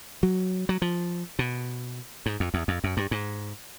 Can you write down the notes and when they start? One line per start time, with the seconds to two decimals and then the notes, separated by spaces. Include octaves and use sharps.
0.23 F#3
0.69 F#3
0.82 F3
1.39 B2
2.26 G#2
2.40 F2
2.54 E2
2.68 F2
2.84 F#2
2.97 G2
3.11 G#2